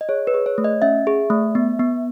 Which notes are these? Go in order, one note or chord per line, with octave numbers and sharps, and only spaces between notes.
D#5
G#4 C#5
B4
G#4
C#5
A3
D#5
C#4 E5
G#4
A3
B3
B3